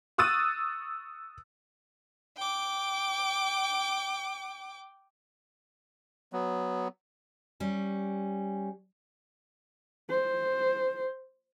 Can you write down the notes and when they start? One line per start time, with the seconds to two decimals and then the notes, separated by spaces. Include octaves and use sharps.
0.18 C#6 D#6 E6 F#6 A6 D#7
2.37 G5 D6
6.33 F#3 B3
7.60 G3 C#4
10.10 C5